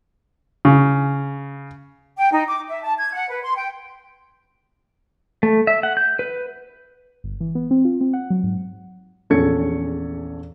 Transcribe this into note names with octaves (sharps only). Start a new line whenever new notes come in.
C#3
G5
D#4
D6
E5
A5
G#6
F#5
B4
C6
G5
A3
E5
F#5
G6
B4
G1
E3
B3
C4
F4
C4
F#5
F#3
G#2
A#1 E2 C#4 A4 G#6 C#7